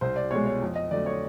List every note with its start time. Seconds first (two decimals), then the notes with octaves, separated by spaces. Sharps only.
0.01 C2 C5
0.16 D5
0.31 B2 G#3 C#5
0.46 C#5
0.62 F2
0.75 D#5
0.91 D3 F#3 A3 D5
1.06 C#5